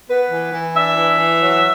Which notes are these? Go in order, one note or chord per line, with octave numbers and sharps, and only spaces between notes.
B3 B4
E3
E3
D4 E5
E3
E3
F#3